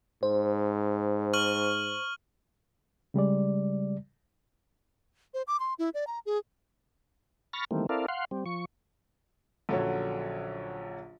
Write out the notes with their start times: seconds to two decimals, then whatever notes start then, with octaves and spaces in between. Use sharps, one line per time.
0.23 G#2 C5
1.34 C#6 F6 F#7
3.14 C#3 G3 G#3 D5
5.34 C5
5.47 D6
5.60 C6
5.79 E4
5.94 D5
6.07 A#5
6.26 G#4
7.53 B5 C#6 F6 A6 A#6
7.71 D#3 E3 G3 A3 A#3 C4
7.89 C4 E4 A4 A#4 D5 F5
8.08 F5 F#5 C6
8.31 G3 C4
8.46 F3 C#6
9.69 A#1 D3 F#3 C#4 C#5